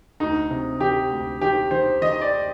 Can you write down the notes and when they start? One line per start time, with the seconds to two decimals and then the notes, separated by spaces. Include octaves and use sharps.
0.20 D2 D#4
0.51 C3
0.80 D#3 G4
1.11 D2
1.41 D#3 G4
1.71 D#3 C5
2.02 D#3 D#5
2.22 D5